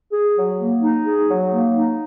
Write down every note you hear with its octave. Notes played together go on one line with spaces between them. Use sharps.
G#4
F#3
A#3
D#4
G#4
F#3
A#3
D#4